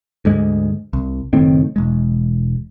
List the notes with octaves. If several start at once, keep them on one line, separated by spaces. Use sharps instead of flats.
D2 G#2 G#3
C2
F#1 A2 D#3 C4
E1 G#3